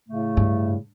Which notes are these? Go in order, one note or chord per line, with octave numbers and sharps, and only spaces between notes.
A2 C#3 A3
G2